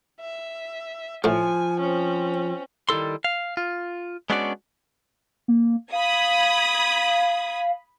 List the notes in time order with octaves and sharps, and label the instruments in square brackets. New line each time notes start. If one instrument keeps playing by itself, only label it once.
[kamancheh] E5
[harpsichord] A2 A3 [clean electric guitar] F3 [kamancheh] G#5
[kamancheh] C4 C#4
[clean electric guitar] D#3 G3 E4 A4 C6
F5
F4
G#3 B3 C#4 D4 F#4 D5
[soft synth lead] A#3
[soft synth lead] F5 [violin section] B5 D#6 G#6